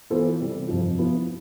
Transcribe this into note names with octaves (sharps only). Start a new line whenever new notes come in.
E3 B3 F4 A4 C5
C3 E3 G3
F2 C3 F3
F3 B3 E4